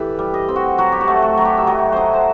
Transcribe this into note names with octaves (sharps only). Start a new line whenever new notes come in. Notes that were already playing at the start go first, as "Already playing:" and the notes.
Already playing: E3 G4 A4 B4
G3
D#5
C4
F#4
F#3 F#4
G4
F#4
A3
F#4
F#3
G4
E5
F#3 D#5
E4 C5 D#5
C5